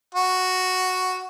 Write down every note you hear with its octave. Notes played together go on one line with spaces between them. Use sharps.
F#4